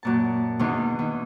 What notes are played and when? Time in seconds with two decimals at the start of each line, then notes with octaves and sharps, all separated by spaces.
0.03 F#2 A#2 A5
0.59 E2 B2 D3 D#3 B3 D4
0.99 D#3